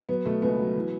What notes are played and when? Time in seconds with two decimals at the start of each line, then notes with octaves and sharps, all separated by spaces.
0.09 F#3 B3
0.25 B2 A3
0.42 C#2 B3
0.59 F#3
0.75 E3